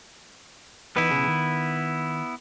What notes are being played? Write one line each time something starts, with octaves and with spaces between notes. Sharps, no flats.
E3 B3 D#4 E4 B4
B1 C#3 G#4
D#3